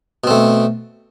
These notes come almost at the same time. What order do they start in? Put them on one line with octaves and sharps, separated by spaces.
B2 C4 A3